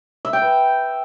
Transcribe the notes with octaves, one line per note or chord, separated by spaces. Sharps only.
E5
G5
B4